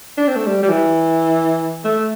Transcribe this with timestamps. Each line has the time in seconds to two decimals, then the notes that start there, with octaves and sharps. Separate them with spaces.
0.17 D4
0.27 C4
0.36 A3
0.46 G3
0.63 G3
0.69 E3
1.84 A3